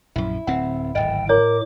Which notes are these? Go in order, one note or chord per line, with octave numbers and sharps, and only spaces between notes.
A#1 F#2 E4
D1 C4 F#5
D1 G#1 D#5 G5
A2 A#4 C#5 D6